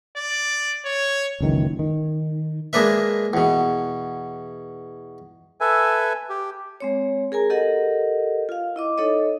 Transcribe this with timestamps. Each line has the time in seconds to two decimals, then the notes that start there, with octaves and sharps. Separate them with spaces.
0.17 D5
0.85 C#5
1.40 F#1 C#2 D#3 E3
1.79 D#3
2.73 G#3 A#3 D4 B4 E5
3.33 E2 B2
5.61 A4 B4 E5 G#5
6.30 G4
6.80 G#3 C4 C#5
7.32 G#4 A#4 G#5 A#5
7.50 G4 A4 A#4 D#5 F#5
8.49 F4 F5
8.76 E4 D#5 D6
8.98 D#4 A4 C#5 D#5